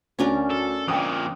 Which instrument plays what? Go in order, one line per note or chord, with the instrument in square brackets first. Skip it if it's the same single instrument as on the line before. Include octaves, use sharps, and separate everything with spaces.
[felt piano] D2 [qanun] C#4 D4 A#4
[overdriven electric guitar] A4
[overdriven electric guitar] F2 A#2 [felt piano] G5 D#6